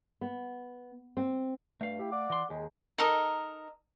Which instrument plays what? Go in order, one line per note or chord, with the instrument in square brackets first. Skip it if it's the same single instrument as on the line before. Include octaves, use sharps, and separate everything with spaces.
[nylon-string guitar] B3
C4
[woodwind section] G2 [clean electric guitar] A3 F5
[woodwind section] E4 G4
D5 F#5 D6
[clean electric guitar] E3 C6
[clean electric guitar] D#2 [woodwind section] G#3
[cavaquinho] D#4 A4 A#4 D#5